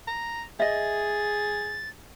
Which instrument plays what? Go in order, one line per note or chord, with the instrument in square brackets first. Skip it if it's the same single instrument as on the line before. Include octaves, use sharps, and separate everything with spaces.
[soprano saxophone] A#5
[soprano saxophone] G#4 [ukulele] D#5 E5 [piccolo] A6